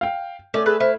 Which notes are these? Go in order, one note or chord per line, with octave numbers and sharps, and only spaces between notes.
F5 G5
A3 C#4 D5
G#4 A4 B4
E4 C5 F5